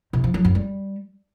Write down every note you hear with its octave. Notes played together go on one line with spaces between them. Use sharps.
C3
F3
F#3
F#2
G3